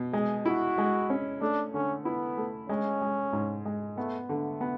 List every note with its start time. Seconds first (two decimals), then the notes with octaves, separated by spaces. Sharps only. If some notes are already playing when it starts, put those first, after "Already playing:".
Already playing: B2
0.13 G#3 G#4
0.46 E4 F#4
0.78 G#3
1.10 C#4
1.41 A3 D4
1.74 D3 C#4
2.05 B3 E4
2.37 A3
2.69 G#3 C#4
3.01 G#3
3.33 G#2
3.65 G#3
3.97 A3 B3
4.29 D3 A3
4.61 B3